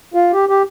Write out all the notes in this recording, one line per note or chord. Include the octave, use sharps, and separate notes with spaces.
F4
G4
G4